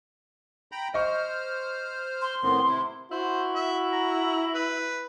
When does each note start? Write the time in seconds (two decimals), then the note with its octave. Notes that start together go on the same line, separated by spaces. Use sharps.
0.72 G5 A#5 B5
0.94 C5 D#5 C#6 F6
2.21 C6
2.43 A2 D#3 B3 C4
2.65 C3 E4
3.11 E4 F#4 C5
3.55 E5
3.92 A#5
4.55 B4